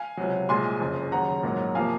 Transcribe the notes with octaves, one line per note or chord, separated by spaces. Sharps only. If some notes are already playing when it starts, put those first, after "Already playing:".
Already playing: F5 G#5
C#2 C3 F#3
C2 A#2 G#3 G#5 C6
F#1 F2 C#3
D#2 C#3 F#3 F#5 A#5
A#1 G#2 F#3 A#3
C3 F3 A#3 F5 G#5